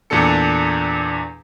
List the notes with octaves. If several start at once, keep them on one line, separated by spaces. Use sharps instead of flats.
E2 A#2 D4 A4 C#7